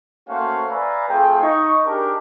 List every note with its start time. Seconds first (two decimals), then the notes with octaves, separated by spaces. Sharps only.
0.28 A3 A#3 C#4 F#4 C5 F5
0.69 B4 D5 E5 F5 G#5 A#5
1.08 A3 C4 F4 G#4 G5
1.40 D#4 C#6
1.85 D4 D#4 G4 G#4 A#4